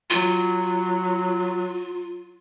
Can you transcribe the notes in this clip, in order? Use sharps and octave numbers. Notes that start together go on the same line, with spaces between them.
F#3 F4